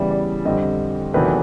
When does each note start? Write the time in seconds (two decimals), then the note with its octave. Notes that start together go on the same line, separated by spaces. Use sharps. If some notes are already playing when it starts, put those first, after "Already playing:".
Already playing: C#3 E3 G3 B3 D5
0.11 D5
0.45 F2 D3 G3 C4 D#5
1.14 E2 C3 D#3 F#3 A3 B4